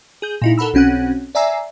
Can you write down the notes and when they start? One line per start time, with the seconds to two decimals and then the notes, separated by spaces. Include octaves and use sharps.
0.22 G#4 G6
0.42 A#2 D#4 E4
0.58 A4 A#4 F#5 B5 E6
0.74 B1 C4 C#4 F#5 F#6
1.35 D5 E5 G#5 A#5 E6 C7